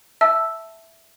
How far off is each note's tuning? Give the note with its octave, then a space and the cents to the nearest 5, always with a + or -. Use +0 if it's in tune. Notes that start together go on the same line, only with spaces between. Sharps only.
E5 +0 A5 +0 E6 +0